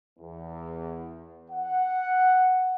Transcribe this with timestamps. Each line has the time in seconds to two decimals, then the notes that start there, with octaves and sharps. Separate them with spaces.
0.19 E2
1.51 F#5